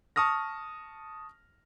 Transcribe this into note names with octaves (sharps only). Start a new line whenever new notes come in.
A5 C#6 D#6 F6 A#6